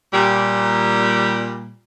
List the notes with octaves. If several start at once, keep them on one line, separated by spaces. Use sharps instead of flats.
A#2 G3